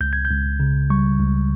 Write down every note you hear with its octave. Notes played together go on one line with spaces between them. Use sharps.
C#2 G6
G#6
G6
C#2
C#3
G3 C#6
C#2